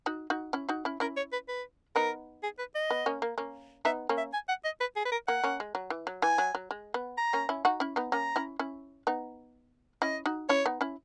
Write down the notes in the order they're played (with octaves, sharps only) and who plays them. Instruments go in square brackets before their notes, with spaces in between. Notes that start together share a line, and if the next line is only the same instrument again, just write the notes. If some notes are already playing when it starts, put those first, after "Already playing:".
[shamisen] D#4 F#4
D#4 F#4
C#4 E4
D#4 F#4
C#4 E4
[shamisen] C#4 E4 [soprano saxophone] A#4
[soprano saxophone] C#5
B4
B4
[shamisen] B3 D#4 [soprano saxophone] A#4
[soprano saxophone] G#4
B4
D#5
[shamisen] B3
A#3 C#4
A#3
A#3 C#4
[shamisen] B3 D#4 [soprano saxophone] E5
[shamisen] A#3 C#4
[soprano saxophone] E5
G#5
F#5
D#5
B4
G#4
B4
A#4
[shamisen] A#3 [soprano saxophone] F#5
[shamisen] A#3 C#4
G#3
F#3
E3
F#3
[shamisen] E3 [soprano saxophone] G#5
[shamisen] F#3
F#3
G#3
B3
[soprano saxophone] A#5
[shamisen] A#3 C#4
C#4 E4
D#4 F#4
C#4 E4
B3 D#4
[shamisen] A#3 C#4 [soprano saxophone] A#5
[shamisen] C#4 E4
C#4 E4
B3 D#4
[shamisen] C#4 E4 [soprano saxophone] D#5
[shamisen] D#4 F#4
[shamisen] C#4 E4 [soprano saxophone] C#5
[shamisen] B3 D#4
C#4 E4